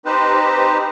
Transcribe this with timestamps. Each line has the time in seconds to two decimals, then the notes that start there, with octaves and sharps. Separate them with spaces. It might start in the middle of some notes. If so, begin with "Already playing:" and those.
0.05 C4 D#4 G4 B4 C5